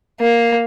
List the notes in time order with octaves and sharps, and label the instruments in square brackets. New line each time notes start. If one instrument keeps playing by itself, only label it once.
[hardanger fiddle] A#3